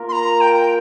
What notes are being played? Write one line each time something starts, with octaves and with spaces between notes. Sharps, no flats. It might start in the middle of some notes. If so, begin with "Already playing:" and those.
Already playing: A#3 F4 A#4
C6
A#5
G5